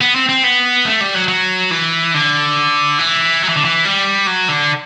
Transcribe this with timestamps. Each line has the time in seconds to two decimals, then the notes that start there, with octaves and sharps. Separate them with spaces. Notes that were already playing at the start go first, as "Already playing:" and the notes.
0.01 B3
0.16 C4
0.29 C4
0.44 B3
0.86 A3
1.01 G3
1.14 F#3
1.28 F#3
1.71 E3
2.14 D3
2.99 E3
3.42 F#3
3.49 E3
3.57 D3
3.65 E3
3.85 G3
4.27 F#3
4.48 D3